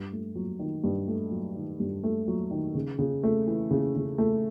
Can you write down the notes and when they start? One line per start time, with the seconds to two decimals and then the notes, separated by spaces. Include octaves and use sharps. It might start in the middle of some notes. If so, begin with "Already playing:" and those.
Already playing: G2
0.12 A3
0.35 F#3
0.59 D#3
0.84 G2
1.08 A3
1.31 F#3
1.56 D#3
1.80 G2
2.04 A3
2.28 F#3
2.51 D#3
2.75 C#3
2.99 C#3
3.23 A3
3.47 E3
3.71 C#3
3.95 C#3
4.18 A3